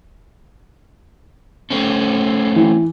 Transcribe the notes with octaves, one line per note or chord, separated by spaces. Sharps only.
A3 C4 C#4
E3